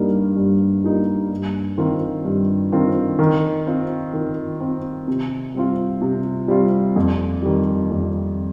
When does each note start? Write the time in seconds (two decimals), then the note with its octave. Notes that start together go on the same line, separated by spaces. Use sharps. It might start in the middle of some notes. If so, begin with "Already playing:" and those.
Already playing: G2 G3 A#3 D#4
0.37 G2
0.84 G3 A#3 D#4
1.31 G2
1.78 D#3 C4 F4
2.24 G2
2.72 D#3 C4 F4
3.19 D#3
3.67 C4 F4
4.13 D#3
4.60 C4 F4
5.08 C3
5.55 G3 C4 F4
6.02 C3
6.48 G3 C4 F4
6.96 F2
7.42 D#3 G3
7.90 F2